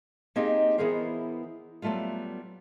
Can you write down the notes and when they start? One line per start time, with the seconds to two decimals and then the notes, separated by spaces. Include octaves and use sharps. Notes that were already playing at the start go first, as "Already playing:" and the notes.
0.36 A#3 C4 D#4 G4 G#4 D#5
0.78 E3 B3 E4 G#4 A#4 C5
1.82 F#3 G3 A3 B3 F4